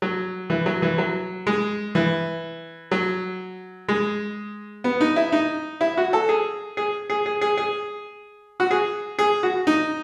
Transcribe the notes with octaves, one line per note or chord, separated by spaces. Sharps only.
F#3
E3
F#3
E3
F#3
G#3
E3
F#3
G#3
B3
D#4
E4
D#4
E4
F#4
A4
G#4
G#4
G#4
G#4
G#4
G#4
F#4
G#4
G#4
F#4
D#4